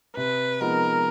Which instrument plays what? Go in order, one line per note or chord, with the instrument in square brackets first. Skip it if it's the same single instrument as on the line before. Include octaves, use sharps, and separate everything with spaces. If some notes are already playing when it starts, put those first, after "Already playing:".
[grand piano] C3 [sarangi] B4
[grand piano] F3 G#3 B3 D#4 [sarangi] A#4